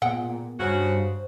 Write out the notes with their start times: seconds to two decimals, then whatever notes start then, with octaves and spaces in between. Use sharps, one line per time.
0.02 A#2 G#3 B3 F#5 G5
0.59 G2 C#3 F#4 C5